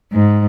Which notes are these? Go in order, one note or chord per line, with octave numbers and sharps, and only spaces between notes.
G#2